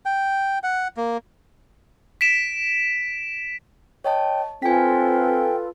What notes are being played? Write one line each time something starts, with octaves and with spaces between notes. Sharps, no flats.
G5
F#5
A#3
B6 D7 E7
C#5 D#5 G5 A5
C4 F4 A4 B4 G5 G#5 B6